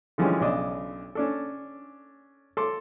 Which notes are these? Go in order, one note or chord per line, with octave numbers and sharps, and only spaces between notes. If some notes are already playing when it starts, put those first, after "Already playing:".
D3 E3 F3 G3 G#3 C#4
B1 C#3 D4 D#5 D#6
C#4 D4 A4
A4 C6 D6